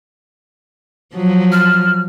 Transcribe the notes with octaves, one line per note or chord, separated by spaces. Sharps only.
F3 F#3
F6